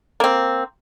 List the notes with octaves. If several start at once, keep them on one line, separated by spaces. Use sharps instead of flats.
A#3 C4